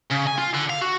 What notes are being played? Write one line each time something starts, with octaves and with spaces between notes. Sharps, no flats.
C#3
G#5
F4
D3
F5
F#4